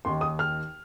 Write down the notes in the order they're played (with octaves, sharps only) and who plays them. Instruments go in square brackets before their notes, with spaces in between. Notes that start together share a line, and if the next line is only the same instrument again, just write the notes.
[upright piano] D#2 D#3 C6
D#6
F6